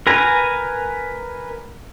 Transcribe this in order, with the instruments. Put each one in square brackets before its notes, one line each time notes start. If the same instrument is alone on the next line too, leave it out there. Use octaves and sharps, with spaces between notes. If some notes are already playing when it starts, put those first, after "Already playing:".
[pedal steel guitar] A#4 B4 G#5 A#5